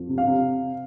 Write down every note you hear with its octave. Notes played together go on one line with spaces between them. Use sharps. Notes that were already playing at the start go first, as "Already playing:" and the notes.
Already playing: F2
C3
F5
C3